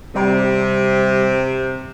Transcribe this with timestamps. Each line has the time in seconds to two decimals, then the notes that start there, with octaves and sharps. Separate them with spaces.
0.15 C3 G3